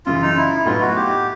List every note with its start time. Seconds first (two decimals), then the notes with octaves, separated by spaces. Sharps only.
0.06 F#2 C#3 E3 F4
0.22 D#4
0.37 E4
0.66 A2 F#3 B3 D#4 F4
0.81 F#4
0.96 G4